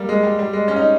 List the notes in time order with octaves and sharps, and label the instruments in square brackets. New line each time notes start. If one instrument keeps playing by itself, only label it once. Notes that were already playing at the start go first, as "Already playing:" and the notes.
Already playing: [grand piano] G3 A#3
G#3
G3
G3
G#3
C#4
D#4